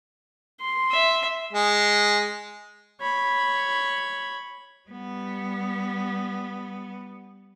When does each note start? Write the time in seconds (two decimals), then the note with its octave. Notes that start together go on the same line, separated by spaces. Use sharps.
0.61 C6
0.91 E5
1.53 G#3
3.00 C#5 B5
4.89 G3 B3